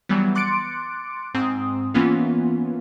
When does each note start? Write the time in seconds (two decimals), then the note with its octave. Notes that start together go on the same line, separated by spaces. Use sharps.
0.09 E3 F#3 G3 B3
0.35 C6 D6 F#6 A6 C#7 D7
1.34 G#2 C4 D#6
1.94 E3 A#3 B3 C#4 F4